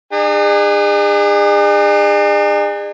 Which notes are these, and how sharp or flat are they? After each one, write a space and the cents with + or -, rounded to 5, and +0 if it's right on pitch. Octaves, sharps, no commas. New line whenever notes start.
D4 +45 G#4 -30